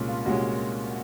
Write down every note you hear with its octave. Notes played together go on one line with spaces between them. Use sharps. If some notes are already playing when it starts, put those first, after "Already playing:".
Already playing: C2 A#2 G#3 C#4
F4
C2 A#2 G#3 C#4 F#4